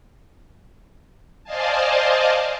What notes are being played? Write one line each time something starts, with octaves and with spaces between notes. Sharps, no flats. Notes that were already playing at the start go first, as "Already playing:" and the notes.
C5 D5 D#5 F5 G#5 A5